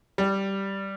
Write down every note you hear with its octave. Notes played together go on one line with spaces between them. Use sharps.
G3